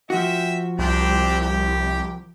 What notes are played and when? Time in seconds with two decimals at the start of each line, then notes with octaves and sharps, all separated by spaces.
0.10 F3 F#4 E5 G5
0.79 C2 C4 D4 G4
1.41 G4